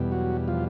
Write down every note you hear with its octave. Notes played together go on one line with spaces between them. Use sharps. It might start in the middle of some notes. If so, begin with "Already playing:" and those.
Already playing: E2 B2 G3
F#3 F#4
F3 F4